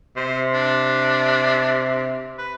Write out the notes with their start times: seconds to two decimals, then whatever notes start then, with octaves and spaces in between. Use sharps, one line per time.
0.16 C3 C5
0.53 D4
2.38 B4